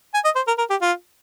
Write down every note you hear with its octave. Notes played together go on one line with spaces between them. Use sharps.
G#5
D#5
C5
A#4
A#4
G4
F4